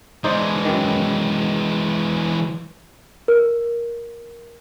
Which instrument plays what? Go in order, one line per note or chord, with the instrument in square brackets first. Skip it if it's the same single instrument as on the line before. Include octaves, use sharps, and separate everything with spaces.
[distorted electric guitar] E3 G#3 [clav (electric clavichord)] D#4 C5 D5
[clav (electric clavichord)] F#2 D#3
[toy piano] A#4